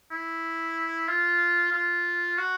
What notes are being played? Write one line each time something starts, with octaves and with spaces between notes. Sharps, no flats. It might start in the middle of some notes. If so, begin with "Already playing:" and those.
E4
F4
F4
F#4